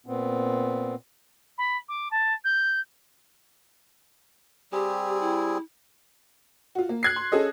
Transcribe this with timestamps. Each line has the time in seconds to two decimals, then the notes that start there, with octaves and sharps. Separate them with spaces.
0.06 A#2 B3 C4
1.58 B5
1.89 D6
2.11 A5
2.44 G6
4.72 G3 C4 G4 G#4
5.21 E4
6.75 F4 F#4
6.89 A#3
7.03 F#6 G#6 C7
7.16 C6
7.32 C#4 G#4 A4 D#5